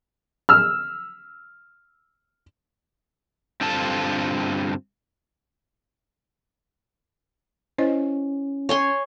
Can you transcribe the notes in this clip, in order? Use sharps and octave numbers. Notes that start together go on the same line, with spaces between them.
E6 F6
G2 D3 C4 F4 A4 A5
C#4 E4 C5 D#5
C#5 G#5 C6